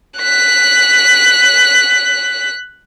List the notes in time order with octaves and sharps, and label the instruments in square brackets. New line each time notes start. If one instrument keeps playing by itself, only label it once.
[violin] F#6 B6